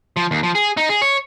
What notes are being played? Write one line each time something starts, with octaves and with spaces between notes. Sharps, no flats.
F3
D#2
F3
G#4
D#4
G#4
C#5